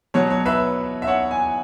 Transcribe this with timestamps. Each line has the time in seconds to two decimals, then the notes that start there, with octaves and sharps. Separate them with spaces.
0.14 B2 F#3 C#5
0.30 C#5
0.45 B4 E5
1.02 E5
1.07 C#5 F#5
1.31 G#5